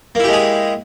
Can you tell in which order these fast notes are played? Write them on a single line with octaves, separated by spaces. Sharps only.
A#3 E4 G4 G#3 G#4